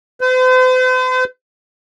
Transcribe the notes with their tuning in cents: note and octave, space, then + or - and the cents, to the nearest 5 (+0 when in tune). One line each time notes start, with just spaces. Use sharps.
C5 -45